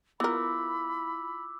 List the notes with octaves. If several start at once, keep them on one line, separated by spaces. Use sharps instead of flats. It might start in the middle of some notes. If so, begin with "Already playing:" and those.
B3 E4 F4 A#4 B5 D6 E6